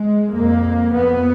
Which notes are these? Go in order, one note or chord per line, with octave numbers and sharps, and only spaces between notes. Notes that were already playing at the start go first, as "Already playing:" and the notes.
Already playing: G#3
F2 A#3
F2 B3